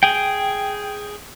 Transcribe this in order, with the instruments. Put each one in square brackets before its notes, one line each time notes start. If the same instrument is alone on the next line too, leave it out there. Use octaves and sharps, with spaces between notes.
[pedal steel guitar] G#4 G5